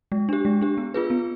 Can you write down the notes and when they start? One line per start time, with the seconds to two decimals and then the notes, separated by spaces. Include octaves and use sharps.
0.12 G#3
0.29 D4 G4
0.45 G#3
0.61 D4 G4
0.78 B3
0.94 F4 G#4 B4
1.10 B3